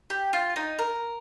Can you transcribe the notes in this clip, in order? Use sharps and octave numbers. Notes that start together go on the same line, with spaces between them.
G4
F4
D#4
A#4